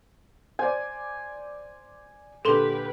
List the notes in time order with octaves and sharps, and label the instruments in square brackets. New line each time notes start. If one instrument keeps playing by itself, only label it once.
[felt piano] C5 D5 [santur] G#5
[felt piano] A#2 D3 [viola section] G4 B4 [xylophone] A4 C6 G7